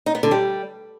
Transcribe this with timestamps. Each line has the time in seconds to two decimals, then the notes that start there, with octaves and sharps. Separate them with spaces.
0.06 D#4
0.15 B3
0.23 D3
0.31 G3